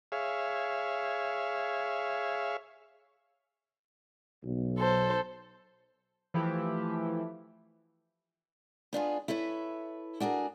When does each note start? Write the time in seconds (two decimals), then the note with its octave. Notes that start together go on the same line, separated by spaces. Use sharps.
0.12 G#4 C#5 E5 F5
4.44 B1
4.79 A4 C5
6.34 E3 F3 A3 E4 G4
8.93 B3 D4 F4 G#4
9.28 E4 A4 B4 C#5 E5
10.20 D4 F#4 G#4 A#4